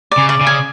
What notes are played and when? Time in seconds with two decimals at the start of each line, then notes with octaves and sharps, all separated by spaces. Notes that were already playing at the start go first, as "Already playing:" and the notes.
0.11 D5
0.17 C#3
0.29 D5
0.41 C#3
0.47 G#5